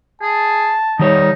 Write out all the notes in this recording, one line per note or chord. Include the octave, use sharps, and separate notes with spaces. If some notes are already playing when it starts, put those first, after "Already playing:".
G#4 A5
D#3 G3 D#4 C#5